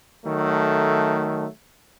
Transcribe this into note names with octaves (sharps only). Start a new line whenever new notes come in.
D#3 F#3 A3